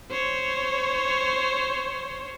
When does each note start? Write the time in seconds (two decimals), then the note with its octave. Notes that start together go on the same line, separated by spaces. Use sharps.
0.10 C5 C#5